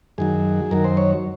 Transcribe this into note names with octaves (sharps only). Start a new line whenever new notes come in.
F#2 D#3 F#3 G#4
F#2 D#3 F#3 A#4
C5
C#5